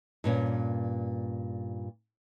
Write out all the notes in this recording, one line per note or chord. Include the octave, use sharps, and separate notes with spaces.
G2 A#2 C#4